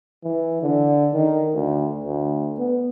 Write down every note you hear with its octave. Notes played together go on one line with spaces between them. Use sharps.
E3
D3
D#3
D2
D2
B3